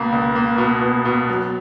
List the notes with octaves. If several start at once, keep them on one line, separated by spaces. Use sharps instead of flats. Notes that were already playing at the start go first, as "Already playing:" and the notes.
Already playing: C#2 B2 A#3
C#2
A#3
B2
B2
B2
F#3